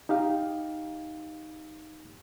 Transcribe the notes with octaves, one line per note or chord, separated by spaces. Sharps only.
D#4 G4 F5